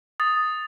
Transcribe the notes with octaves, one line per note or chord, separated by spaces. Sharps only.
D#6 A6